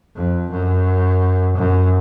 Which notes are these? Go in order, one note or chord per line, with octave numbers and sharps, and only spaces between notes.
F2
F#2
F#2